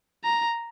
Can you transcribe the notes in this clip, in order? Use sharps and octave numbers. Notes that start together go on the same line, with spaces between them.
A#5